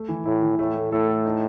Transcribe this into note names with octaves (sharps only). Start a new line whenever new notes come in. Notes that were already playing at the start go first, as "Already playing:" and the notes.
Already playing: A3
E3
A2 E4
E3
A2 A3
A3
A2 A4
A3
D#4